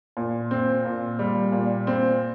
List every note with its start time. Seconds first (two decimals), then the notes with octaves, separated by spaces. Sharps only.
0.17 A#2
0.51 C4
0.85 A#2
1.19 G3
1.52 A#2
1.87 C4